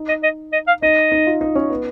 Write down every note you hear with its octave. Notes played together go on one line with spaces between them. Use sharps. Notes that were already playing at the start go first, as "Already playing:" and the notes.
Already playing: D#4
D#5
D#5
D#5
F5
D#4 D#5
D#4
F4
D#4
C#4
B3